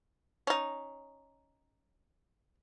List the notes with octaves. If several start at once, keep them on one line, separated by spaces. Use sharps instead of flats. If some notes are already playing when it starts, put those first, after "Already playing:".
C#4 D#4